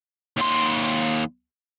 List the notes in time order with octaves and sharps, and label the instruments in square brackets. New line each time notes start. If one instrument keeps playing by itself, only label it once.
[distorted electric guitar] D#2 C6